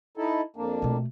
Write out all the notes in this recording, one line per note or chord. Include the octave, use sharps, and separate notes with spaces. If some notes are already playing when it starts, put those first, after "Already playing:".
D#4 E4 A4
F2 A#3 D4
B2 A3